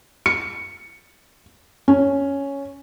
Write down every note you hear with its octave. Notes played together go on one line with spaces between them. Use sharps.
C#7
C#4